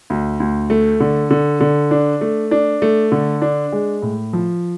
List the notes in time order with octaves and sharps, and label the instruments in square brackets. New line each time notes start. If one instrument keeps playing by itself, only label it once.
[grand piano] D2
D2
A3
D3
D3
D3
D4
A3
D4
A3
D3
D4
G#3
A2
F3